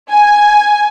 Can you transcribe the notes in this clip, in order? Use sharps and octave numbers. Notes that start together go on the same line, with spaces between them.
G#5